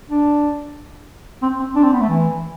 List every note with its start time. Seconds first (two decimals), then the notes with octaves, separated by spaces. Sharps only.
0.09 D4
1.42 C4
1.59 C4
1.75 D4
1.83 C4
1.92 B3
2.00 A3
2.09 E3